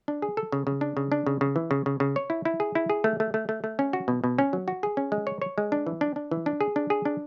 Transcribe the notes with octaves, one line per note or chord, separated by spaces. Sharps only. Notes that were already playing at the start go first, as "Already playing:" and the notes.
D4
G#4
A4
C#3
C#3
D4
C#3
D4
C#3
C#3
E3
C#3
C#3
C#3
C#5
E4
E4
G#4
E4
G#4
A3
A3
A3
A3
A3
C#4
F#4
B2
B2
C#4
F#3
F#4
G#4
C#4
G#3
C#5
C#5
G#3
D4
E3
D4
D4
E3
D4
G#4
D4
G#4
D4